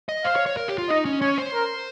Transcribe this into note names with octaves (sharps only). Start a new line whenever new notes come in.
D#5
C5 F5
C#5
C#5
A#4
G4
F4
D#4 D#5
C#4
C#4 C#5
C5
A#4